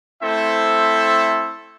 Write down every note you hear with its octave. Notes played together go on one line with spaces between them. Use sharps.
A3 C4 E4 A4 C5 E5